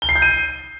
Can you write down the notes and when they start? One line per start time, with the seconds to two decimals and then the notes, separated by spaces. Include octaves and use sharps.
0.02 G7
0.09 C7
0.16 G6
0.22 D#7